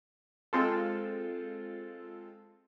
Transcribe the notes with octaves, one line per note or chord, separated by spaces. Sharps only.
G#3 C4 F4 A4